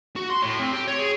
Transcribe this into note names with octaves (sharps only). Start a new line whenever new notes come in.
F#4
C6
A2
C4
G4
C#5
G#4